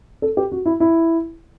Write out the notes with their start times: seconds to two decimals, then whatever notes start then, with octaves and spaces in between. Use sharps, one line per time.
0.22 A4
0.37 G4
0.52 F#4
0.66 E4
0.80 E4